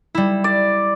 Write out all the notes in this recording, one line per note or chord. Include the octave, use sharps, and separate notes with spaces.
G3 E4
D5